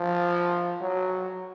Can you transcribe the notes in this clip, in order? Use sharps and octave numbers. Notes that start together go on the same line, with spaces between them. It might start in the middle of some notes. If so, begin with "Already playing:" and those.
Already playing: F3
F#3